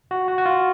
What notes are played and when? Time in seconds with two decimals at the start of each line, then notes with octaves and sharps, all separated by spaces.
0.11 F#4
0.28 F#4
0.38 F#4
0.46 F4